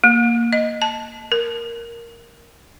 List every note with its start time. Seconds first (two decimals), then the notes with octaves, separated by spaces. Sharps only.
0.04 A#3
0.53 D#5
0.82 A5
1.32 A#4